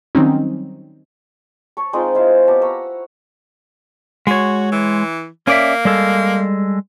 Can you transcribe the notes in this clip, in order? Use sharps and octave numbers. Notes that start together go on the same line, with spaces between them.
D#3 F#3 G3 C4 C#4 D#4
C#5 A5 C#6
G#3 C4 D#4 F4
E4 C5 F5
B3 G4 A5
F#5 A#5 C#6 E6
G#3 F#4 C#5
E3
A#3 C#4 D5 E5
G3 G#3 A4